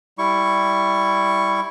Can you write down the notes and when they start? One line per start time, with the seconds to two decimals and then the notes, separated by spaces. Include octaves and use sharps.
0.18 G3 E4 C#6